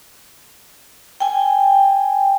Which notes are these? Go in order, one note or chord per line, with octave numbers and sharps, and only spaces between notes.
G5 G#5